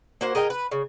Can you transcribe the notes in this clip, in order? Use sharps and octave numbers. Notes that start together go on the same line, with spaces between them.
A#3 F#4 C5
G#4 A#4 D#5 G5
B4
C#3